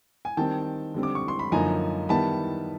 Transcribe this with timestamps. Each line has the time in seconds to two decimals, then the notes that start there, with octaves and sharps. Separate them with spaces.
0.25 G#5
0.37 D#3 G3 C4 G5 A5
0.94 D3 G3 C4
1.03 D6
1.15 C#6
1.28 C6
1.39 B5
1.52 F#2 D3 F3 A#3 D#4 G#5 A#5
2.09 D#3 G3 B3 E4 A5 B5